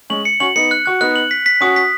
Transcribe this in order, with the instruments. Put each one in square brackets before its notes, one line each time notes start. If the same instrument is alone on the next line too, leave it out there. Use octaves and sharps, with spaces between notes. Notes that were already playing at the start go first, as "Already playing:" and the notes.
[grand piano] G#3 C#4 [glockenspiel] F#7
[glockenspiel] C#7
[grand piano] C#4 F#4 [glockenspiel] F#7
[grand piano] B3 D#4 [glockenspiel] C#7
[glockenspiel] F#6
[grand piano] F#4 [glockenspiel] F#6
[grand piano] B3 D#4 [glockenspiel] F#6
[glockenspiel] F#7
B6
B6
[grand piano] C#4 F#4 [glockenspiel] D#6
[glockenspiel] B6